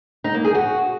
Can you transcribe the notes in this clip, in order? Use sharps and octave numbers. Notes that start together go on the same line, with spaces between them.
D#4
A#3
G#4
F#4